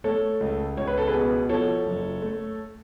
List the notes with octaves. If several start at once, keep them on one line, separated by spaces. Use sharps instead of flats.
A3 A4 C#5
C#2
C#2 C#5
B4
A4
G#4 B4
B2
F3 A4 C#5
F#1
A3